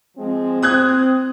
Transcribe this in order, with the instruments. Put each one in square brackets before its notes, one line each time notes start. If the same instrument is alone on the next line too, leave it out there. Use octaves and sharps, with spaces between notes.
[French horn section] F3 G#3 C4
[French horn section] C4 [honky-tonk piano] D#6 F#6 G#6